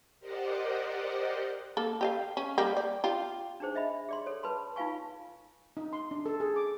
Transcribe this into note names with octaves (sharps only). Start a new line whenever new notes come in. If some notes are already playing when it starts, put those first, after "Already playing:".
G4 A#4 C5 D5 D#5 F#5
A#3 A4
G4 D#5 F5
C#4
G3 A#3 G4
D5
F4 G4
D4 D#4 G#4 C5
D4 D#5 E5 B5
G#4 D5 C6
A4 C#5
B4 A5 B5 C6
D#4 F4 B4 F5 G#5 C#6
D#4
C6
D4
A4
G#4
D6